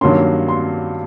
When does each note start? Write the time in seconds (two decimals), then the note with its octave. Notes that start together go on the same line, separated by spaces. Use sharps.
0.01 G2 D#3 F#3 A#3 C#4 C6
0.48 C6